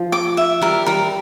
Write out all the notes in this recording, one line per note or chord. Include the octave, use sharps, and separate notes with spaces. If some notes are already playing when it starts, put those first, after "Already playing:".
Already playing: F3
D6
E5
G3 A#4
G3 A#4